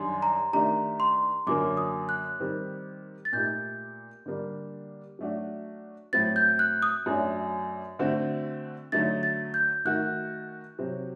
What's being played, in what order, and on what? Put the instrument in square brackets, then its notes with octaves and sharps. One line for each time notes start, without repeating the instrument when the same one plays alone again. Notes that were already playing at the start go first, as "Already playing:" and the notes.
Already playing: [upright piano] F#2 D#3 G3 D4 [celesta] C6
[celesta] A#5
[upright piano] D#3 A3 D4 G4 [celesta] A#5
[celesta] C6
[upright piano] F#2 D3 F#3 A#3 [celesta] D6
[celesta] D#6
F#6
[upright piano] D#3 G3 C4 G4
[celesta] A6
[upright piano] A#2 A3 D#4 G4 [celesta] G6
[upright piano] D3 G3 A#3 D4
F#3 A3 D4 F#4
[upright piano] A2 F#3 C4 [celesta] A6
[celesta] G6
F#6
D#6
[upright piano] F#2 F#3 A3 D4
D3 A3 C4 F#4
[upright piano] D3 F#3 A3 D#4 [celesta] A6
[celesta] A6
G6
[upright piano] D#3 A3 D#4 F#4 [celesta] F#6
[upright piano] C3 F#3 C4